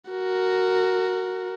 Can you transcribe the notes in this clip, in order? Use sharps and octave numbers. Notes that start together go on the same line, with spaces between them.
F#4 A#4